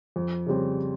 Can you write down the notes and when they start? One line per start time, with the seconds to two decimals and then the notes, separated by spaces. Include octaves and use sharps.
0.16 F2
0.46 C#3 G3 C4